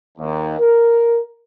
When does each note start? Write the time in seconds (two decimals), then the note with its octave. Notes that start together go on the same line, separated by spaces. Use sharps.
0.18 D#2
0.59 A#4